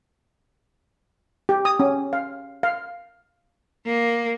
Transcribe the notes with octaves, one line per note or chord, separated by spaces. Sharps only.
G4
D#6
C#4
F5
F5
A#3